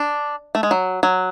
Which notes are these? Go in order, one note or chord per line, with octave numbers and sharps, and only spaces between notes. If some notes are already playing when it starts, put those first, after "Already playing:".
Already playing: D4
A3
G#3
F#3
F#3